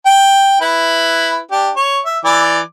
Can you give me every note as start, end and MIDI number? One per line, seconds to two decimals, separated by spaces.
0.06 0.57 79
0.61 1.38 64
0.61 1.38 71
1.51 1.70 62
1.51 1.70 67
1.76 2.00 73
2.05 2.19 76
2.25 2.60 52
2.25 2.60 74
2.25 2.60 86